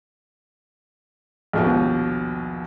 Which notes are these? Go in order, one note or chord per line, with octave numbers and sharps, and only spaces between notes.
A#1 D#2 B2